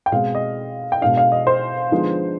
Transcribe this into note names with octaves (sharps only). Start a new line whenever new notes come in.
G5
B2 G#3 C4 F5
D#5
G5
B2 G#3 D4 F5
F5
D#5
C5
D3 F3 G#3 B3 D#4